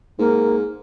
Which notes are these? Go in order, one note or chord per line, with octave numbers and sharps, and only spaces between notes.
G#2 A#3